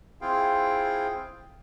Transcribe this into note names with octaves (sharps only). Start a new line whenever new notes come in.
C4 E4 F4 G#4 F5 G5